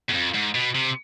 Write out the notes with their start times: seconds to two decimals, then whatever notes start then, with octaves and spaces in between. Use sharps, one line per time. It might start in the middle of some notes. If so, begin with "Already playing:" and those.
0.09 E2
0.13 F2
0.34 G#2
0.55 B2
0.75 C3